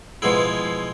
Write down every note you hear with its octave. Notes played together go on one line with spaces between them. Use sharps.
B2 F3 G#3 E4